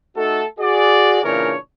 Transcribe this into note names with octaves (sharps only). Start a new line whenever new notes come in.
A3 D#4 F#4 A4
F#4 G#4 D5
A#2 C#3 E3 D4 A#4 C#5